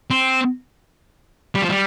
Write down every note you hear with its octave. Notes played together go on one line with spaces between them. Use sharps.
C4
G3
F3
G3